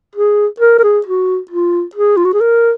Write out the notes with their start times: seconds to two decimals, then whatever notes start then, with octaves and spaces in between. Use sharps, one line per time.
0.15 G#4
0.60 A#4
0.79 A#4
0.84 G#4
1.06 F#4
1.51 F4
1.95 G#4
2.17 F4
2.25 F#4
2.33 G#4
2.41 A#4